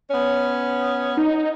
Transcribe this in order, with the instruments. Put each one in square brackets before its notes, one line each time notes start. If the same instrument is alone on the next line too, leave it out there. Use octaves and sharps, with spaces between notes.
[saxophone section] B3 C#4 C#5
[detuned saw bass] D#4